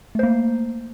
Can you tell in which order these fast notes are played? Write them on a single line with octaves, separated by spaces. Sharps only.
A3 C5 A#3